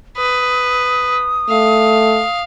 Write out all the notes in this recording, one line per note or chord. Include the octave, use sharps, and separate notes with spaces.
B4 D#6
A3 F5